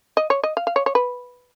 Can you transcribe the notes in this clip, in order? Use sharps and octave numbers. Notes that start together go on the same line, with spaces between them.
D#5
C#5
D#5
F5
F5
C#5
C#5
B4